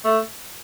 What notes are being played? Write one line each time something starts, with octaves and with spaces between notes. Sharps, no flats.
A3